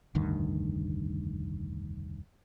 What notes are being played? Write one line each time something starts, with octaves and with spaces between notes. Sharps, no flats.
F1 D2 G2 D#3